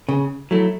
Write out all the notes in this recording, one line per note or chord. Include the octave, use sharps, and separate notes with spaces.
C#3
F#3 A3 E4